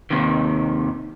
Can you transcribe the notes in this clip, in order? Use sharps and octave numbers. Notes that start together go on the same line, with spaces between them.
D#2 C3 D#3